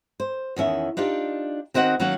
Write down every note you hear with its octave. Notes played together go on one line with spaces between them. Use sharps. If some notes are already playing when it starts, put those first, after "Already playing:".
C5
E2 D#3 C#4 E5
D4 D#4 F4 G4
D#3 C4 F#4 D#5 F#5
D#3 F#3 A#3 C#4 F#4